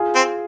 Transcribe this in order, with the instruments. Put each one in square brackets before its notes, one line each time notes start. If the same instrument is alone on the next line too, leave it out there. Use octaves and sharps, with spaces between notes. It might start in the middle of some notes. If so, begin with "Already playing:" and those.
Already playing: [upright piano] F4 G#4
[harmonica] C4